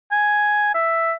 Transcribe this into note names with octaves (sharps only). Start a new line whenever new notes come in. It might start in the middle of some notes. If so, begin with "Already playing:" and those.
G#5
E5